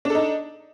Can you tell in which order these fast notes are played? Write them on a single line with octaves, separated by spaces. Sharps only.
D4 A4 D#4